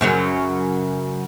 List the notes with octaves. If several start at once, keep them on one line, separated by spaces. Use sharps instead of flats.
F#2 C#3 F#3